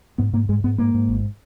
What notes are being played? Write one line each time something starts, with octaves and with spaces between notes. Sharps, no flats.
G#2 B3
G#2 A#3
G#2 G#3
G#2 B3
G#2 A#3
G#2
G#1